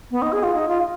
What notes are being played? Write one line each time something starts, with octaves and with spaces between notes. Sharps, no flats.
B3
D#4
G#4
F4
D#4
F4